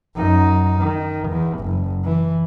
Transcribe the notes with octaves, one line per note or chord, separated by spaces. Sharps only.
F#2 D#4
D#3
E2
F#1
E3